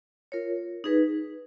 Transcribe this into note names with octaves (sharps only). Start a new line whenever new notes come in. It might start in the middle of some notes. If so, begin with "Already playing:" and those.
F4 A#4 C#5
D#4 G#4 B4